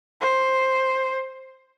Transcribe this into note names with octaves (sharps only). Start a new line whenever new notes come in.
C5